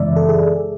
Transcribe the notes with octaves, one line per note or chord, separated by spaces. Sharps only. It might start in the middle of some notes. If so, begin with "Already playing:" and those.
Already playing: F#2 C#3 E3 G#3 B3 D5 E5
A4
G#4